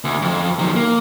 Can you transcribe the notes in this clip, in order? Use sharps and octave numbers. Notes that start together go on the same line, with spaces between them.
D2
F2
D#3 F#3
A#3